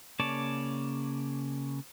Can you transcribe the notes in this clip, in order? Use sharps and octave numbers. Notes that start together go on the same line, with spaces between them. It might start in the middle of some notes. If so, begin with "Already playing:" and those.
C#3 A#3 C#5 D5 A5